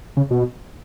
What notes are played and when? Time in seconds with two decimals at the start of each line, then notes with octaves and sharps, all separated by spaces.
0.17 C#3
0.31 B2